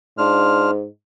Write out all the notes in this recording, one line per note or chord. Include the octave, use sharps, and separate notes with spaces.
G#2 D4 F4 F6